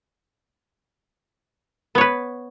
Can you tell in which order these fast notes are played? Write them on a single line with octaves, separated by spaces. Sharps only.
B3 C#5 B4